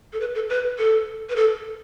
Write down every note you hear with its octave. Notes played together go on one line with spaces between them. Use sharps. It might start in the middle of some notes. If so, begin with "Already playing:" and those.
A4
B4
A4
B4
A4
B4
A4